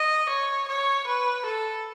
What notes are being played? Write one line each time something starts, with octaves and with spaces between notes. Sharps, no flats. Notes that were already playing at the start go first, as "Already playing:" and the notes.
Already playing: D#5
C#5
C#5
B4
A4